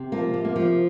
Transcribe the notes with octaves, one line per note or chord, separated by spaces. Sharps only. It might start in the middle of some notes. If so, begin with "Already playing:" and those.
Already playing: C3
F3 A#3
C3
A#3
F3